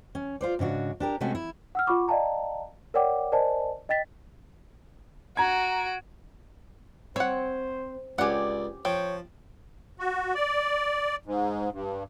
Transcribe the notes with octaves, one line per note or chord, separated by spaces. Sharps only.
C#4
F4 C5 D5
G#2 C#3 D4 F#4
D4 G4 A#4
C3 G#3 A3 C#4 F#4
E4
F#5 E6 F6
F4 F#5 B5 C#6 D6
D5 D#5 F5 G5 A5 A#5
A#4 C#5 D5 F#5 G5 D6
A#4 C5 D5 D#5 G#5 A5
D#5 G5 A6 B6
F#4 A#5 G#6 D7
C4 C5 C#5 F#5
C#2 C#4 G4 D5 F#5 G#5
F3 C#5 G5
F#4
D5
G#2
G2